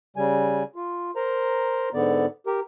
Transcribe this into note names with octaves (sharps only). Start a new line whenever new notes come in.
C#3 G3 G#5
F4
A#4 C5 A#5
G#2 D3 B3 D5
G4 A#4